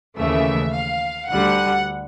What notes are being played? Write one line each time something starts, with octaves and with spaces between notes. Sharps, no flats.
D#2 C#3 E3 A3 E5
F5
D2 D3 G3 F#5